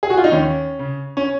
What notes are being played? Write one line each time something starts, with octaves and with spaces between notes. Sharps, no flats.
G#4
F#4
F4
D#4
D#2 C#4
C#3
C#4